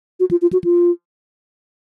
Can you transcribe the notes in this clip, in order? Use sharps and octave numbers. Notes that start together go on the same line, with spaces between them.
F#4
F4
F4
F#4
F4